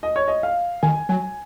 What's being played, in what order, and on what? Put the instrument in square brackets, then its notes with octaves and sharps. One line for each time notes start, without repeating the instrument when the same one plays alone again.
[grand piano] D#5
C#5
D#5
F5
[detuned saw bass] D#3 [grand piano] G#5
[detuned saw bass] F#3 [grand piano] G#5